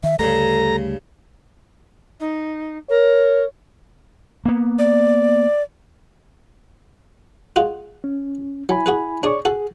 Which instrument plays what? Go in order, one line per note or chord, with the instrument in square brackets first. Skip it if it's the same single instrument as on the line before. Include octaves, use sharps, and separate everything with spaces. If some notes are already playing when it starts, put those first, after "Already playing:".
[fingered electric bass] D#3 [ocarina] E5
[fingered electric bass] D2 G3 A3 [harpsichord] G2 C#3 [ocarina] A4 [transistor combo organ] A#5
[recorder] D#4
[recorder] A#4 [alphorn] C#5
[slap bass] A#3 B3
[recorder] D5
[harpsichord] G#3 F4 F#4
[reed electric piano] C#4
[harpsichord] F#3 [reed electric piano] E4 G#5 B5
[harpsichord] F#4 G#4 B4
[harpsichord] D4 G#4 [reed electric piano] C#5 D5 C#6
[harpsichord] F#4 A4 [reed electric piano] G#4